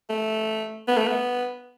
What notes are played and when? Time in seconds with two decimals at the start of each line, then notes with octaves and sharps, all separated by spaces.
0.10 A3
0.88 B3
0.97 A3
1.07 B3